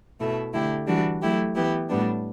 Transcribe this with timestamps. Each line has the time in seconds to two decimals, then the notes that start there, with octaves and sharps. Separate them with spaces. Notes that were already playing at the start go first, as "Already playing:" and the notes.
0.19 B2 A3 E4
0.53 D3 A3 E4 G4
0.87 E3 G3 D4 F#4
1.21 F#3 A3 E4 G4
1.54 E3 B3 E4 G4
1.88 A2 G3 B3 D4